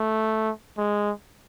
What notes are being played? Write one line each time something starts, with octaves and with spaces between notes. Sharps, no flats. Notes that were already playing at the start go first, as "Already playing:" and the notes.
Already playing: A3
G#3